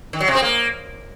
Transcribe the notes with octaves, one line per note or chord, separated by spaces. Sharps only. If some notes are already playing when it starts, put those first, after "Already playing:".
D#3
F#3
C3
C4
A#3